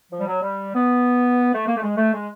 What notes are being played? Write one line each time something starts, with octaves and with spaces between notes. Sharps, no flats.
F3
G3
F#3
G3
B3
A3
A#3
A3
G#3
A3
G#3